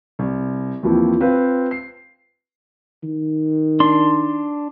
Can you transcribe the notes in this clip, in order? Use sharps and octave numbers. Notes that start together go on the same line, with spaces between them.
C2
D#2 E3 F3 C4
C4 F4 B4 F5
C7
D#3
D4 C6